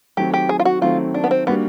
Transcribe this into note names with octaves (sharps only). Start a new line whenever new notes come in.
D#3 F#3 A3 C4 G4
G4
G#4
F4
F#4
D#3 F#3 A3 C4 F4
D4
B3
C4
G3 A#3 B3 D4 F#4